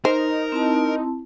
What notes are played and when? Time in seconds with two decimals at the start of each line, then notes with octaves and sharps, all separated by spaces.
0.05 D#4 A#4 C5
0.52 C4 E4 A5